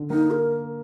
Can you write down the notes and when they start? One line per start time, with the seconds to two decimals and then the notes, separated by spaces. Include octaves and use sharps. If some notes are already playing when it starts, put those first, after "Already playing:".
Already playing: D3
0.10 A#3 D#4
0.31 A#4